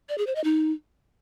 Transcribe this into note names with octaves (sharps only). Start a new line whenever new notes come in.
D5
G#4
C5
D#5
D#4